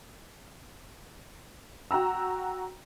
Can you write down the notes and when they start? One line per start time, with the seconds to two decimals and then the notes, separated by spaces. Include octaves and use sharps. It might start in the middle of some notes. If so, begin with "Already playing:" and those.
1.91 F#4 G5 A#5 E6